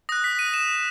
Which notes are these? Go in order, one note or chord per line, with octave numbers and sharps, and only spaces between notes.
D#6 F#6 A#6
B6
D#7
E7